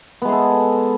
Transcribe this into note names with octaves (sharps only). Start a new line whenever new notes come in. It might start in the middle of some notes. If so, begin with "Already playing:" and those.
G#3 B3 G#4 A4